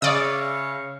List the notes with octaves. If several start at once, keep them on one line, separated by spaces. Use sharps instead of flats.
C#3 C#5 D5 E5 F5 D#6